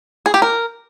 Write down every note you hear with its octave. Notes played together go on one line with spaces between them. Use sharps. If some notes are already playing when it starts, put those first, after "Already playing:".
G#4
G4
A#4